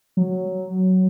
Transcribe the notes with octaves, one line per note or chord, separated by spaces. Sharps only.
F#3